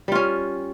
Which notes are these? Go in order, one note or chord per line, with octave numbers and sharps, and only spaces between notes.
G3 C#4 F4